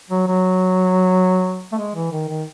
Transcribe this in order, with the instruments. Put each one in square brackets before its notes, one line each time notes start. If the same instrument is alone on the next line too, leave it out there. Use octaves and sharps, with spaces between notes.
[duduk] F#3
F#3
A3
G#3
E3
D#3
D#3